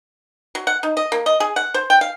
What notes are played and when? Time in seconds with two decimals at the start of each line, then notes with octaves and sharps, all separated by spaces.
0.55 F#3
0.67 F#5
0.83 D#4
0.97 D#5
1.12 A#3
1.26 D#5
1.40 G#4
1.56 F#5
1.74 C5
1.90 G5
2.01 F5